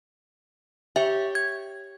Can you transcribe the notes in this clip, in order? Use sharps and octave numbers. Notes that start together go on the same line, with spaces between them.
G4 C#5 E5
G#6